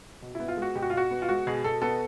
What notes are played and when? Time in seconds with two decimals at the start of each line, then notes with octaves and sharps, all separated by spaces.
0.22 B2
0.35 B3 E4
0.48 F4
0.57 G#3 F#4
0.75 B2 G4
0.82 F#4
0.90 F4
0.93 B2 F#4
1.11 B3
1.22 F4
1.29 G#3 F#4
1.47 B2 G#4
1.64 B2 A4
1.82 B3 A4